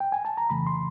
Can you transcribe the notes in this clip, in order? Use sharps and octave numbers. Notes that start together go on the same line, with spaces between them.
G5
G#5
A5
A#5
F2 C#3 E3 A3 B5
C6